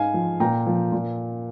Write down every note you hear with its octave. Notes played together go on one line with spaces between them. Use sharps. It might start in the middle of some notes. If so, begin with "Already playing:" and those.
Already playing: G#2 F5 G#5
F3
A#2 G5 A#5
F3
A#2